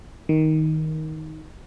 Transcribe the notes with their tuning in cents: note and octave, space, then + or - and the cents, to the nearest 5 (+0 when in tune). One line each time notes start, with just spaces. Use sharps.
D#3 +10